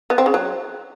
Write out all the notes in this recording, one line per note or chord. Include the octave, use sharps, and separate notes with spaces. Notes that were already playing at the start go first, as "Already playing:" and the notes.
B3
C4
C#3
F#3